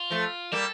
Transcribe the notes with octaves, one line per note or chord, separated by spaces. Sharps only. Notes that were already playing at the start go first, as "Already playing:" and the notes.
Already playing: F4
F3 A3
G3 A#3 A4